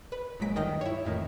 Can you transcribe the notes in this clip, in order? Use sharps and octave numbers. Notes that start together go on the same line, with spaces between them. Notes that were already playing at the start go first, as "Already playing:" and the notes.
B4
G1 A#2 F#3 G#3 B6 D7
D2 G2 D#3 D#4 G5 A#6
E4 C#5
F2 A2 D#3